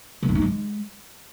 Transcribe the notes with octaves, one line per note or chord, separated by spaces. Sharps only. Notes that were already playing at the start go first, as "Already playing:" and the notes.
D3
E4
D#4
G#3